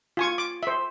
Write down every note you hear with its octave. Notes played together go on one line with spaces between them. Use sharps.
F4 G#5 C#6
D6
C5 E5